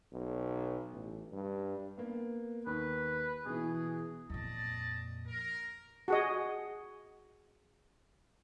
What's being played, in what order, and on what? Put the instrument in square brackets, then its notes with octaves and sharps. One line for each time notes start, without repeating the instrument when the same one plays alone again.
[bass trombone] B1
A1
G2
[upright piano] A#3 B3
[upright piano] D#2 [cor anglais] B4
[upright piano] B2 E3 [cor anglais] G#4
[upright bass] F2 A#2 [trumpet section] D5 D#5 A5
[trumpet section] A#4
[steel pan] F#4 G#4 D#5